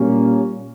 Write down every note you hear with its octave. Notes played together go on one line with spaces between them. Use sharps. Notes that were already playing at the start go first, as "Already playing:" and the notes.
Already playing: A#2 G3 A#3 C#4